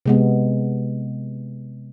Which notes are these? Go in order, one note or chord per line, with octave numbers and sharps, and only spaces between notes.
C3 G#3 B3